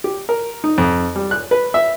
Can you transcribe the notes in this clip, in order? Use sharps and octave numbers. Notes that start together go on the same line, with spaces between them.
G4
A#4
D#4
F2
G3
F#6
B4
E5